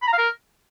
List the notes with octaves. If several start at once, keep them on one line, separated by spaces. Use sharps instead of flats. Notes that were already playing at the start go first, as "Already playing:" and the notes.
B5
A#5
F5
A#4